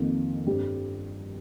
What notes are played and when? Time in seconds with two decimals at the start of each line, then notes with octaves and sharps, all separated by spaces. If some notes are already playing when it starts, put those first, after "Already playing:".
Already playing: F2 D#3 A#3
0.46 G2 G3 C4 G4